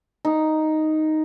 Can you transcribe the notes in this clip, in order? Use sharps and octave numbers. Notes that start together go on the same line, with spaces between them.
D#4